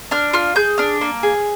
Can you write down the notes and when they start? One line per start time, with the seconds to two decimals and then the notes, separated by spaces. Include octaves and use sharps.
0.11 D4 F6
0.33 F4 F6
0.56 G#4 G6
0.78 D4 F6
1.01 A#3
1.23 G#4